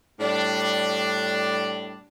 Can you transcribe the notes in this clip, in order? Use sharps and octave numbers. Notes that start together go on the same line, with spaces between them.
A2 G3 D4